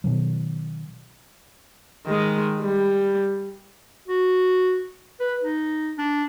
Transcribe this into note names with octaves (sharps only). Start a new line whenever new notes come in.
B2 D#3 F#3
D#3 G#3
G3
F#4
B4
D#4
D4